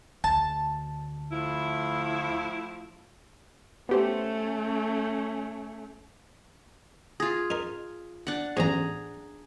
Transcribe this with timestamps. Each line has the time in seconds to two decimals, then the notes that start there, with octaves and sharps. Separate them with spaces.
0.24 D2 A5
1.32 A2 F3 E4
3.89 A3 B3 C#4 G4 C5
7.20 F4 G#4
7.50 D#4 A#4
8.27 D4 F#5
8.57 A1 E2 G#2 G#4 A#5